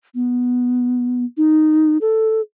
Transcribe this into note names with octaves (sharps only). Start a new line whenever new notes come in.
B3
D#4
A4